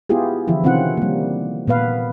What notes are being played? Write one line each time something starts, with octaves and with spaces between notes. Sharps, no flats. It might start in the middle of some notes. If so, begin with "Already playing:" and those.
B3 E4 F4 G4 G#4
D3 E3 F3 E4
C3 D#3 C4 C#4 F4 F#5
G3 A#3
A#2 B3 B4 F5